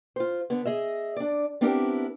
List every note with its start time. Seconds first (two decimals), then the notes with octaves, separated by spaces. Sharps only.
0.16 F4 C5
0.50 D3 B3
0.65 G#4 D#5 E5
1.16 D4 D5
1.61 B3 C4 D4 E4 G4 A#4